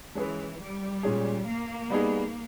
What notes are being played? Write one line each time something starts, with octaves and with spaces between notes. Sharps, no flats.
E3 G#3 C#4 G#4 B4
G3
A#2 G#3 C#4 G#4
A#3
G3 B3 D#4 G#4